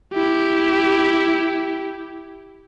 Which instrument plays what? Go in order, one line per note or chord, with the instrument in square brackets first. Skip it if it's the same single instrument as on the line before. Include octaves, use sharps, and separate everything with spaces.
[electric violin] E4 G4